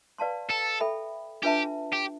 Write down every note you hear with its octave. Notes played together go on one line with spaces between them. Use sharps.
B4 D5 F5 A5 C6
A4
A4 E5 G5 B5
D4 F4 G4 B4 E5 A5
G4